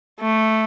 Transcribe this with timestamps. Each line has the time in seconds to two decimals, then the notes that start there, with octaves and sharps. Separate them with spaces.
0.21 A3